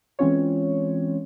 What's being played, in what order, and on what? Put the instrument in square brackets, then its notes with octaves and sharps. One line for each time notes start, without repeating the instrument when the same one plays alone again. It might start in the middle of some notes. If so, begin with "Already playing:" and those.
[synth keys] E3 G#3 C4 C#4 F4 C#5